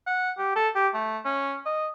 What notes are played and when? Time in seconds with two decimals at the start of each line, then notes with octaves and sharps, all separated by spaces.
0.07 F#5
0.38 G4
0.56 A4
0.76 G4
0.94 A3
1.25 C#4
1.66 D#5